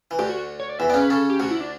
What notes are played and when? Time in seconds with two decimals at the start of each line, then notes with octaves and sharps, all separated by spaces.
0.11 E3
0.19 D2 D3 G4
0.29 F#4
0.60 C#5
0.69 D5
0.79 E2 E3 E5
0.89 C#3 B3 C#4 D5
1.00 B4
1.10 C#3 C#4 A4
1.30 G4
1.40 D2 D3 F#4
1.50 E4
1.61 D4